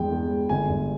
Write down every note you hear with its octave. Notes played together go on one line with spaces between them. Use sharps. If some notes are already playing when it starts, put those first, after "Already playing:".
Already playing: E2 G2 G#3 G5
E2
G#3
G1 G#5
G2